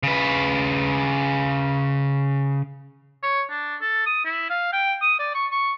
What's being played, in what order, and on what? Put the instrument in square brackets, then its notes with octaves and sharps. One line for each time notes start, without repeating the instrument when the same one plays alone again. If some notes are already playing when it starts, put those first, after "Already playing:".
[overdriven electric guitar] C#3 B4
[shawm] C#5
D4
A4
D#6
E4
F5
G5
D#6
D5
C#6
C#6